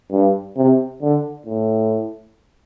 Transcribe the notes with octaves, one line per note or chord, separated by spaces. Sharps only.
G2
C3
D3
A2